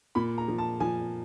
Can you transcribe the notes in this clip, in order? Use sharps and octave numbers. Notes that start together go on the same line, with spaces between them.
A#2 B5
A#5
F3
A5
F3 G#5